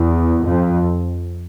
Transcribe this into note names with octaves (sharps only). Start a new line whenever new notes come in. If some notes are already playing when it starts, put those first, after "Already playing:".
Already playing: E2
F2